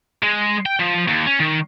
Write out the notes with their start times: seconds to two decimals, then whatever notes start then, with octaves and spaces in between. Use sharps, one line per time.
0.23 G#3
0.66 G5
0.80 F3
1.08 D#2
1.27 C#4
1.40 D#3